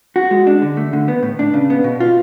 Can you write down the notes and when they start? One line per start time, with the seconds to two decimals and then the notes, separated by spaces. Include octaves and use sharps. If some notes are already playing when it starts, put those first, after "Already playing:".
0.16 F#4
0.31 G#3
0.47 D4
0.62 D3
0.77 A3
0.93 D3
1.08 B3
1.23 A2
1.39 D4
1.54 C#3
1.70 B3
1.84 B2
2.00 F4